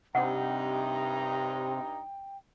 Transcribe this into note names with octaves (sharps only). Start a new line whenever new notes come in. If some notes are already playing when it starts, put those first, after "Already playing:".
G2 C3 D#4 F#5 G5 A#5